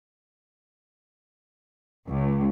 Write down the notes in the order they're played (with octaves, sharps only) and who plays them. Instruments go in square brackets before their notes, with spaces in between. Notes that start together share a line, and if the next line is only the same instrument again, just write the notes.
[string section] C#2